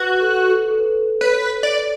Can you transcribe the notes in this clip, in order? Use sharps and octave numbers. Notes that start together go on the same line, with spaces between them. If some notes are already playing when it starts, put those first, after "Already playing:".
Already playing: F#4 B4
A4
A4
A4
B4
B4 C#5
D5